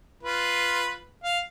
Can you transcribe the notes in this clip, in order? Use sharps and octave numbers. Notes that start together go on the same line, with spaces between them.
F4 B4
F5